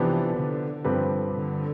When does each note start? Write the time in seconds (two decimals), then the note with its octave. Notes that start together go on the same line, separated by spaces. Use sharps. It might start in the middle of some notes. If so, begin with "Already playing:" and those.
Already playing: C3 E3 F3 B3 D4 G4
0.35 D3
0.84 G2 F3 C4 G4 B4
1.33 D3